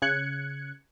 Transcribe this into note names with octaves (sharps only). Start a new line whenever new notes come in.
C#3 F#6 G#6 C#7